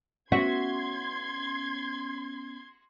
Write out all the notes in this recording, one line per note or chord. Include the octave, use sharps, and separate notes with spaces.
B3 C#4 F#4 E5 C6 G#6